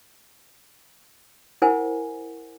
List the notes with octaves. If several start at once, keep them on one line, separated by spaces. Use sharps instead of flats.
E4 A#4 C5 F#5 G#5